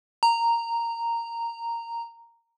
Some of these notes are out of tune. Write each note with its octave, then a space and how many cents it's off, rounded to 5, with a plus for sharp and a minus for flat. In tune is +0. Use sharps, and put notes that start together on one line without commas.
A#5 -10